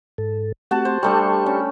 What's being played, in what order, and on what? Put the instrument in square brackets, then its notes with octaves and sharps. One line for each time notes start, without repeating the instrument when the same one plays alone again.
[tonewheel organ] G#2 A4
[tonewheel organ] A3 C4 G4 [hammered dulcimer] F#4 A5
[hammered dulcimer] C5
[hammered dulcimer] G3 A3 D4 [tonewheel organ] G4 C#6
[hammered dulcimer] C#4